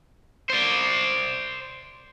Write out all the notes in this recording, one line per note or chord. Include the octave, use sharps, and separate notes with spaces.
C5 D5